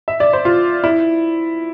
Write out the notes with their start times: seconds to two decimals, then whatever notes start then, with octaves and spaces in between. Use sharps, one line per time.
0.08 E5
0.20 D5
0.33 C5
0.45 F4
0.84 E4